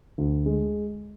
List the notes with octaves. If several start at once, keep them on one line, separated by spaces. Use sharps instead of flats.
D2
G#3